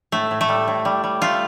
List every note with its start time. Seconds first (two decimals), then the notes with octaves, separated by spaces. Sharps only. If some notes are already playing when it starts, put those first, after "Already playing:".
0.12 A2 A3
0.31 A2
0.41 A3
0.49 G3
0.68 A2
0.85 G3
1.04 G3
1.22 A3 F4